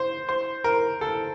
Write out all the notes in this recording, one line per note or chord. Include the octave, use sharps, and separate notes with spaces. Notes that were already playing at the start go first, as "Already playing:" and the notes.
Already playing: C5
C5
A#4
A4